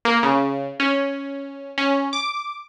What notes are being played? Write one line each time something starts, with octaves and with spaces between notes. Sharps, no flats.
A#3
C#3
C#4
C#4
D6